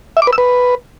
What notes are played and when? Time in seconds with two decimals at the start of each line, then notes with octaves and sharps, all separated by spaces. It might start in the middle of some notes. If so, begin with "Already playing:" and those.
0.17 E5
0.22 D6
0.27 B4
0.33 E6
0.38 B4